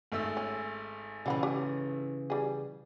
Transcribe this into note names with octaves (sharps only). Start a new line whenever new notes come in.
G#1 A3 E6
C#4
C#3 E3 G3 F#5 B5
G4
G3 G#4